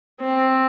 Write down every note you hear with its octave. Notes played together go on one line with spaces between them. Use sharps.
C4